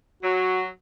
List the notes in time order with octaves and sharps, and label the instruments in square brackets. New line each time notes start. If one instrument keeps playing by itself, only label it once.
[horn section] F#3 [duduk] F#4